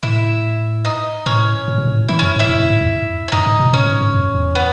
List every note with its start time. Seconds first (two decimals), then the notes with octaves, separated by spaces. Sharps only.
0.03 A2 E4 E5
0.85 D#4 D#5
1.26 A2 C#4 C#5
1.68 A2
1.78 B2
1.87 A2
2.08 E3 E4 E5
2.19 F#2 C#4 C#5
2.36 G#2 E4 E5
2.49 F#2
2.60 F#2
2.70 G#2
2.81 E2
3.28 C#5
3.32 F#2 D#4 D#5
3.46 G#2
3.59 B2
3.73 A2 C#4 C#5
3.87 G#2
4.01 G#2
4.15 F#2
4.35 E2
4.55 B3 B4